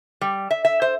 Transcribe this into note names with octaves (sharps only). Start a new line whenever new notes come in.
G3
E5
E5
C5